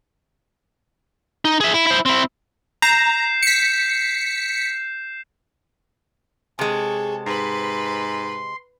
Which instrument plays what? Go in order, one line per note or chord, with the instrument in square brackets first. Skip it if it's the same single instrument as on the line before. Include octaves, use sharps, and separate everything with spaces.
[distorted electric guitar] D#4
G#4 E5
E4
E4 C5
C4 E4
[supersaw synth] A#5 [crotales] G6 C7 E7
[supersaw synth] B6 C#7
[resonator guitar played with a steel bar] C3 G#3 [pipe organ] G#4 [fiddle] A4 C#5
[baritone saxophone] G#2 [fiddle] B4 B5 [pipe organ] C6